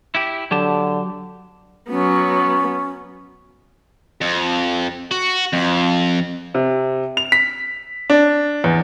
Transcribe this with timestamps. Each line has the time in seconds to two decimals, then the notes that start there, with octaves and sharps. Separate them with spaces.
0.15 E4 G4
0.51 D3 F#3 G4 A5
1.89 F#3 B3 C#4
4.21 F2
5.11 F#4
5.53 F2
6.55 C3
7.17 F7
7.32 B6
8.10 D4
8.64 E2